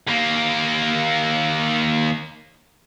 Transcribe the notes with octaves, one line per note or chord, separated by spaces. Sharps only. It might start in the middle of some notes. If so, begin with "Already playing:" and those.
D#2 A#3